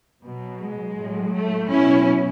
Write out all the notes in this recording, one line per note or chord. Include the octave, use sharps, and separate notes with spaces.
B2 F#3
G#3
A2 F#3
A3
B2 F#3 C#4 E4